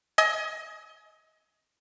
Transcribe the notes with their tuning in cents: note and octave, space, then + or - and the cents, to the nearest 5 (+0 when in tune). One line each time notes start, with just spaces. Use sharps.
D#5 +25 G#5 +25 E6 -40